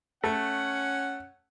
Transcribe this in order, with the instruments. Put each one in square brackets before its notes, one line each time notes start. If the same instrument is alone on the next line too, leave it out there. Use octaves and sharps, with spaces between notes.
[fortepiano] A3 [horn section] C#4 F#5